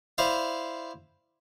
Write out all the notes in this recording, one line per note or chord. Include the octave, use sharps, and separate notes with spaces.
E4 C5 D5 F5